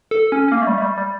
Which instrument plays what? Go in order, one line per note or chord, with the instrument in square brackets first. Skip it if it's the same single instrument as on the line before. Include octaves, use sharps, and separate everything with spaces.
[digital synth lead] A4
C#4
C#4
A#3
A3
G3
A3
G3
G3